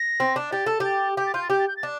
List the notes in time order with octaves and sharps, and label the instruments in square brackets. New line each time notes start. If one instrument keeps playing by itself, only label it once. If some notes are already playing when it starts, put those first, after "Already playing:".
Already playing: [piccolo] A#6
[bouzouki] C4
D4
[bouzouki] G4 [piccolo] A6
[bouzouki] A4
G4
[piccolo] A6
[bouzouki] G4 [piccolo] G6
[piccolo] A6
[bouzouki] F4 [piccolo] G6
[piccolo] A6
[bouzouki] G4 [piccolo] G6
[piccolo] A6
G6
A6
[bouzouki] D4